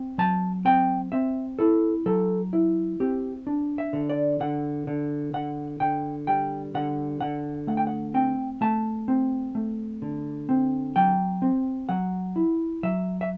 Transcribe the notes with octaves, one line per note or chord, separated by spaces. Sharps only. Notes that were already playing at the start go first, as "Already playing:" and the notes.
Already playing: C4
F#3 A5
C4 G5
C4 E5
E4 A4
F#3 A4
E4
C4 G4
D4
E5
D3
D5
D3 F#5
D3
D3 F#5
D3 G5
G3 G5
D3 F#5
D3 F#5
A3 F#5
G5
F#5
C4 G5
A3 A5
C4
A3
D3
C4
F#3 G5
C4
F#3 F#5
E4
F#3 E5
E5